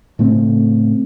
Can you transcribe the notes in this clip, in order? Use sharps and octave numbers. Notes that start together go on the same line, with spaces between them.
A2 C#3 A3 C4